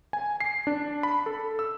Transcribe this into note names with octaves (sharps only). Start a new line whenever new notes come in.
G#5
C7
D4
B5
A4
E6